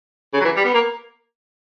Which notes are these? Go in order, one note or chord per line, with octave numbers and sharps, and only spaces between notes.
C#3
F#3
E3
G3
B3
A#3